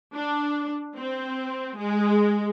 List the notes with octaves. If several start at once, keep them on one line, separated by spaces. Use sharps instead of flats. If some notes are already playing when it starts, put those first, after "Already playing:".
D4
C4
G#3